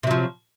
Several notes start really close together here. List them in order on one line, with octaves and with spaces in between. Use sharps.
C3 F#3 F3